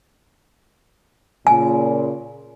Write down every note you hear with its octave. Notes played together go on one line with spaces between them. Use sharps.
A#2 C#3 G#5